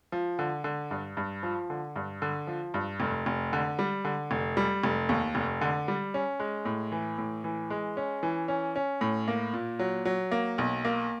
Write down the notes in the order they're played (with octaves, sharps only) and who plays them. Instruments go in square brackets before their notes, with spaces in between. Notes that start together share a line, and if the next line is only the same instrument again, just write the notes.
[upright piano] F3
D3
D3
G2
G2
F3
D3
G2
D3
F3
G2
F1
F1
D3
G3
D3
F1
G3
F1
D#2
F1
D3
G3
C#4
G#3
A2
E3
A2
E3
G#3
C#4
E3
C#4
C#4
A2
A#3
A#2
F#3
F#3
A#3
B1
A#3